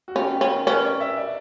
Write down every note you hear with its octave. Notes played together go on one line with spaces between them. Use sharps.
F#4
C#4 G4
G4
C#4
A#4
C#4 B4
D5
E5
D5